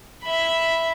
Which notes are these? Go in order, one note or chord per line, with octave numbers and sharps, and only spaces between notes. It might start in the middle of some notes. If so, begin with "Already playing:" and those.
E5 B5